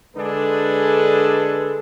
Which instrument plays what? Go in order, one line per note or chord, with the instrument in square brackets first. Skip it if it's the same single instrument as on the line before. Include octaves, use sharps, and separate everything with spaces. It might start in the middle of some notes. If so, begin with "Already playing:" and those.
[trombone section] D3 G#3 D4 G#4 A4 B4